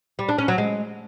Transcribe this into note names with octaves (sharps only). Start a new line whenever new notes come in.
G3
D4
C#4
F#3
G#3